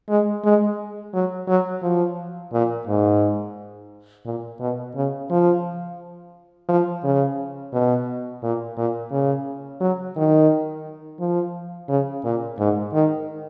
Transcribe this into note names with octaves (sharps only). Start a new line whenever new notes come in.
G#3
G#3
F#3
F#3
F3
A#2
G#2
A#2
B2
C#3
F3
F3
C#3
B2
A#2
A#2
C#3
F#3
D#3
F3
C#3
A#2
G#2
D#3